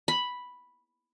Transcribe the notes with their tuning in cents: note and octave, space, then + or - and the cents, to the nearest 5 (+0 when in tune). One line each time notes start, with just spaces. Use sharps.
B5 +0